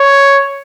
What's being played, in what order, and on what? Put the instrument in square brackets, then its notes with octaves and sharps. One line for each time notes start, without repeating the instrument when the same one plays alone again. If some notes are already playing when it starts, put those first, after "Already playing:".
Already playing: [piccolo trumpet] C#5